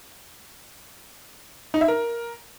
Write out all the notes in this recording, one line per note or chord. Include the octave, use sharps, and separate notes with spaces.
D#4
E5
A#4